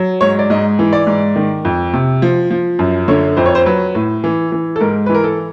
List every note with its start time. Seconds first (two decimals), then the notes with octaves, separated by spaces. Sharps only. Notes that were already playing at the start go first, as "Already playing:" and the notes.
Already playing: F#3
0.21 G#2 C#5
0.39 D5
0.50 G#2 D#5
0.79 E3
0.93 D5
1.07 G#2
1.36 D#3
1.65 F2
1.93 C3
2.22 F3
2.51 F3
2.79 F#2
3.08 D3 C#5
3.37 F2 C5
3.46 C#5
3.55 C5
3.66 F#3 B4
3.95 A2
4.24 E3
4.52 E3
4.76 A4
4.80 G#2 A#4
5.06 E3 B4
5.15 A#4
5.24 A4